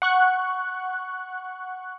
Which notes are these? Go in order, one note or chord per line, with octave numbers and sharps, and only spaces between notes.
F#5 C#6 F#6